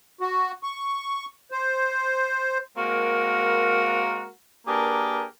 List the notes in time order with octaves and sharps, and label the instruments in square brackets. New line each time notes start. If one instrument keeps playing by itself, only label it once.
[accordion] F#4
C#6
C5
[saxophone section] G#3 A#3 C4 F#4 A#4
A#3 D4 G4 G#4 A#4 B4